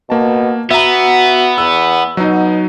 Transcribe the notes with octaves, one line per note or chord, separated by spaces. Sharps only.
B2 A#3 A5
B3 F#4 E5 A#5
E2 E6
B2 F#3 D#4